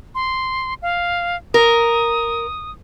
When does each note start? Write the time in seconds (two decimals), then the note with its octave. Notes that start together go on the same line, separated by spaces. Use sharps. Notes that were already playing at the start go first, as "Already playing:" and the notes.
0.15 C6
0.82 F5
1.54 A#4 D#6